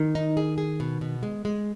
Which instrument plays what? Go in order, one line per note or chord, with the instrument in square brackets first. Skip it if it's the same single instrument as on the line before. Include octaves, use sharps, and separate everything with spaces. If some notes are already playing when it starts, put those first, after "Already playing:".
Already playing: [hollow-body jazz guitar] D#3
[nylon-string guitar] D#4
G#4
G#4
B2
B2
G#3
G#3